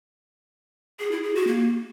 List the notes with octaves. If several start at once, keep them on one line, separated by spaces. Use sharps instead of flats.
G#4
E4
G#4
F#4
A#3